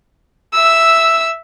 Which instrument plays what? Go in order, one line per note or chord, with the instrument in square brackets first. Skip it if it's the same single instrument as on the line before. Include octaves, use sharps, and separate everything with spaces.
[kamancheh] E5 E6